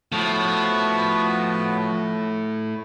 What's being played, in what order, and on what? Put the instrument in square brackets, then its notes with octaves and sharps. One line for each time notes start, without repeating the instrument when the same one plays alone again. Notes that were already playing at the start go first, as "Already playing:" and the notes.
[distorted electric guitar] A2 [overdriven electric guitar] F3 [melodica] B3 F#4 B4